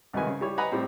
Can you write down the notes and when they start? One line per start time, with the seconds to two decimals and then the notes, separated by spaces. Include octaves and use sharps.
0.13 C2 D#3 G#3 F#4 B4 G#5
0.27 C#3
0.41 G3 E4 C#5
0.58 B4 D#5 F#5 G#5 A#5 B5
0.72 A2 G3 C4